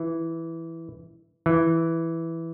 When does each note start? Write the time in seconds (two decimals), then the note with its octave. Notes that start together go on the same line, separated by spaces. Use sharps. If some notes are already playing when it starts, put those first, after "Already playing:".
Already playing: E3
1.46 E3